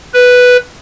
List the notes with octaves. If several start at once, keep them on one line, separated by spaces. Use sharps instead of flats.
B4